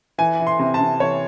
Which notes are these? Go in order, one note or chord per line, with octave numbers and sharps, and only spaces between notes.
E3 G#5
E3
C6
C3
A5
C3
E3 C#5